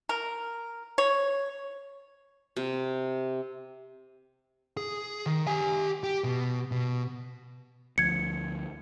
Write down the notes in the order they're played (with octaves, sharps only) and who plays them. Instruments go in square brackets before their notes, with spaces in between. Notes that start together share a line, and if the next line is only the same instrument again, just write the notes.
[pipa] A#4
C#5
[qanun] C3
[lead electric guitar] G#4
D#3
G4 G#5
G4
B2
B2
[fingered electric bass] D2 F3 [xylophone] G#6 C#7